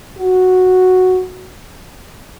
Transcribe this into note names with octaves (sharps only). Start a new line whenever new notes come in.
F#4